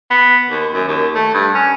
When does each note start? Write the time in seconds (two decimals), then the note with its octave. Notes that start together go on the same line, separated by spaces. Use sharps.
0.11 B3
0.49 D#2
0.74 F#2
0.88 D#2
1.15 A3
1.34 G2
1.55 C#4